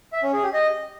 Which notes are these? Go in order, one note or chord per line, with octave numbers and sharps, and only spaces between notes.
E5
C#4
G#4
G4
D#5